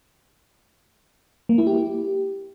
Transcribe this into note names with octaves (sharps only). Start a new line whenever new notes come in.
A#3
E4
G4